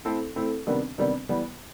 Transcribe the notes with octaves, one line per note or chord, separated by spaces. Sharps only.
A3 C4 E4 A4
A3 C4 E4 A4
C3 D#3 G3 B3 D4
C3 D#3 G3 B3 D4
E3 G3 B3